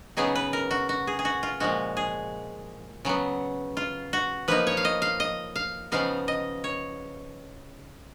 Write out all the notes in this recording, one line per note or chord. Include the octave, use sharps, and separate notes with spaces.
C#3 F#3 B3 D#4 G#4
B4
A#4
F#4
F#4
G#4
G#4
F#4
F4
A#2 F3 G#3 F#4
G#4
C#3 F#3 B3
F4
F#4
F3 A#3 D#4 B4
C#5
F5
D#5
F5
D#5
F5
C#3 F3 B3 D#4 F5
D#5
C#5